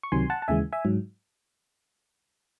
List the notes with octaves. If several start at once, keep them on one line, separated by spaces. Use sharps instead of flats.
C#6
C#2 C3 D#3 F#3 G#5 C6
F#5 A5
A5
D#2 C#3 E3 G#3 E5 G#5
E5 G#5
G#2 F#3